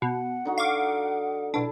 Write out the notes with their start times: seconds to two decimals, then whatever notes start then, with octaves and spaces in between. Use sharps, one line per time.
0.02 B2 F#5
0.45 D3 D#4 F#4
0.58 F5 C#6 D6
1.54 B1 D4 E4 A5